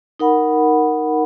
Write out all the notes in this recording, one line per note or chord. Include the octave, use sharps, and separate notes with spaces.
D#4 A#4 F#5 B5